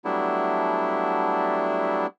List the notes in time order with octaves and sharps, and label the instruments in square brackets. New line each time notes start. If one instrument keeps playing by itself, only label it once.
[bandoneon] F#3 G3 A3 B3 D4 E4